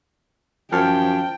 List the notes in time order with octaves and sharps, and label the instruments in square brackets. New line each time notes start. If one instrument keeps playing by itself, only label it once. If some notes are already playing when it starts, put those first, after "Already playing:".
[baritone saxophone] F#2 [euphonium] F3 [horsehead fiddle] G5 [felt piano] A5 F6